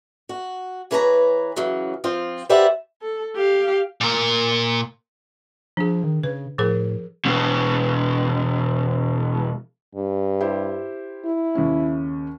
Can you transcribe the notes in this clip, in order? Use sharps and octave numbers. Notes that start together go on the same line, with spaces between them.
F#4
E3 G#4 B4 C#5 G#5 A#5
C#3 E3 F#3
F3 C4 F4
G4 B4 C5 D5 E5 F#5
A4
G4 F5
A#2 A#4
F3 D4 G#4
D#3
C#3 B4
A2 F3 G#4 A#4
E2 B2
G2
E4 G4 C5
E4
D#2 C#3 C#4